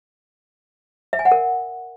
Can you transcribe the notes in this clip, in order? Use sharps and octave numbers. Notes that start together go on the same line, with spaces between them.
E5
G#5
F#5
A#4